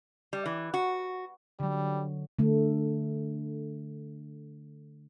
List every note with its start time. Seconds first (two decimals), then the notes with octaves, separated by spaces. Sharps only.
0.33 G3
0.46 E3
0.74 F#4
1.60 D3 F#3 G3
2.39 D3 A3